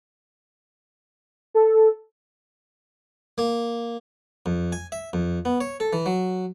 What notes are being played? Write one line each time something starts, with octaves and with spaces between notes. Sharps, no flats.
A4
A#3
F2
G#5
E5
F2
B3
C#5
A4
E3
F#3